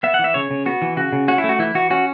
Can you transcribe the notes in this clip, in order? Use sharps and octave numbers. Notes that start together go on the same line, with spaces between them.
B3 E5
F#5
E3
E5
C#3 C#5
C#3
B3 F#4
E3
C#3 F#4
C#3
C#4 F#4
E4
A3
F#4
E3 E4
E3 F#4
C#4 F#4